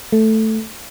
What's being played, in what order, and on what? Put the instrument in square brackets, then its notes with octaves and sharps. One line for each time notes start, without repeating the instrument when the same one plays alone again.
[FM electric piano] A3